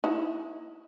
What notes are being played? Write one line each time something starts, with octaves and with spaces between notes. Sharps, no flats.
D#4 E4